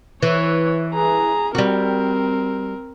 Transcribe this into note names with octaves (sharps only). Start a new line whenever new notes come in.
E3 C#5
G#4 A#5
G3 C4 F#4 A#4